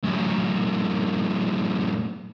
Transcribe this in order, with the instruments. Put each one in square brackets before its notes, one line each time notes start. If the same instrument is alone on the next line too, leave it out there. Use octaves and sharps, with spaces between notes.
[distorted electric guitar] F#2 A2